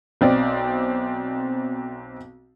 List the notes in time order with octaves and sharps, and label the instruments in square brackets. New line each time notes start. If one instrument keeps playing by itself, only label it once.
[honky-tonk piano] B1 C4 D5